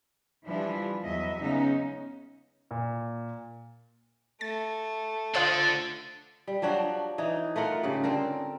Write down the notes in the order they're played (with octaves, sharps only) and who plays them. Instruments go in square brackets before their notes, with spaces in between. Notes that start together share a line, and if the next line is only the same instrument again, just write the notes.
[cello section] E3 F3 G3 D4 E4 F4
E2 F#3 D#5 E5
C#3 G#3 B3 C#4 D#4
[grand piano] A#2
[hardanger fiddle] A3 [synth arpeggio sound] A6
[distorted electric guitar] D3 [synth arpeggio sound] F4 C5 D#6 [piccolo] A6
[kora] G3
F3 F#3 D4 F#4
E3 D#4
A3 F4 A#4 F#5
G#2 C#3 G4
D3 C4 A4 A#4